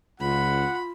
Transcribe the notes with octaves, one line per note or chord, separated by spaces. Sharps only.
C#2 F4 F#5 B5